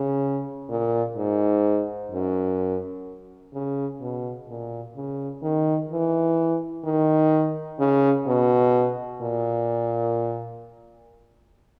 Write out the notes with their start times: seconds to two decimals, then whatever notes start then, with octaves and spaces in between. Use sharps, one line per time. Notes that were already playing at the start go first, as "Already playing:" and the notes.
Already playing: C#3
0.69 A#2
1.17 G#2
2.11 F#2
3.53 C#3
4.01 B2
4.48 A#2
4.96 C#3
5.43 D#3
5.90 E3
6.85 D#3
7.80 C#3
8.27 B2
9.22 A#2